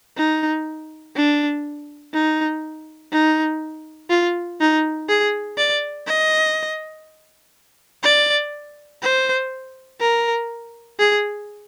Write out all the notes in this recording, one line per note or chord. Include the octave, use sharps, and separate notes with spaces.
D#4
D4
D#4
D#4
F4
D#4
G#4
D5
D#5
D5
C5
A#4
G#4